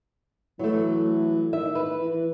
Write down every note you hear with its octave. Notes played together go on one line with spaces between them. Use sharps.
E3 F#3 A3
D#3 E5
B4
E3